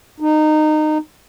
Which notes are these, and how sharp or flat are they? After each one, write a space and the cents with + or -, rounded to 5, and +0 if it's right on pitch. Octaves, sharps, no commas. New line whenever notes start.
D#4 -20